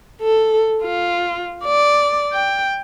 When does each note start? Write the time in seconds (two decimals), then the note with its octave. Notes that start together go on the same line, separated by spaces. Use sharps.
0.22 A4
0.83 F4
1.65 D5
2.33 G5